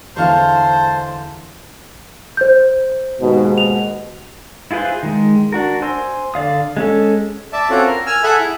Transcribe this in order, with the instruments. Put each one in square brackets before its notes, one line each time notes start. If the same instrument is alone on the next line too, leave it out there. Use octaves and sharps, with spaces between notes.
[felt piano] E2 D3 E3 [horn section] G#2 A5 [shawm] C5 [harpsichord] C#5 F5
[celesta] C5 G6
[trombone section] D#2 G#2 B2
[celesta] F7
[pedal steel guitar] E4 F4 G#4 B4 C5
D#3 G#3
D4 F#4 A#4
C5 G#5 C6 E6
D3 D5 F5 D#6
G#3 C#4 A4
[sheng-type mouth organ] D5 E5 A5
C4 C#4 F4 F#4 A4
A#4
G#5 E6 F6
G#4 A4 E5 F#5 G#5 B5
E4